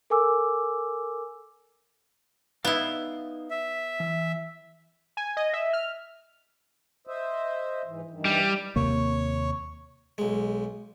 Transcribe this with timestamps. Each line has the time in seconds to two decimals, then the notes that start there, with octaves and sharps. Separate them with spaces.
0.10 A4 A#4 G#5 D6 E6
2.65 B3 D#4 E4 D5 F5
3.50 E5
4.00 E3
5.17 G#5
5.37 D#5
5.53 E5
5.73 F6
7.07 C5 D#5 E5
7.87 G#2 E3
8.11 G2 D#3 E3
8.25 G3
8.76 D#2 C3 A#3 C#5
10.18 B1 G#3